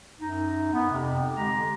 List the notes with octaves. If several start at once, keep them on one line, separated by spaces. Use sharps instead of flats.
F#2 D#4
B3
F2 C3
D3 G#3 G4 A#5